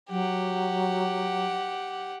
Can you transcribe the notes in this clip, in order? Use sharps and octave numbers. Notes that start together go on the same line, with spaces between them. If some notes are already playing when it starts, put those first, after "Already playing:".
F#3 G4 F#5